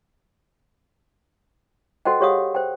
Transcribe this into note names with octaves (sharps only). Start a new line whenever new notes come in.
F#4 A4 C5 D#5 F#5 G5
G4 G#4 C#5 F5 F#5 D#6
C5 G5